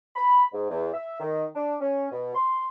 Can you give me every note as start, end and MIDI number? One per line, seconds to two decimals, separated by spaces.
0.16 0.44 83
0.53 0.69 44
0.70 0.91 40
0.93 1.18 76
1.20 1.44 51
1.55 1.75 62
1.80 2.06 61
2.12 2.33 47
2.35 2.68 84